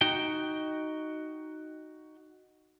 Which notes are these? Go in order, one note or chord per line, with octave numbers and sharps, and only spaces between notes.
D#4 F#4 G5